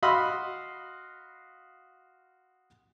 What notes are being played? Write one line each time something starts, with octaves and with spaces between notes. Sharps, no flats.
F#4 D#5 F5 B5 C6 E6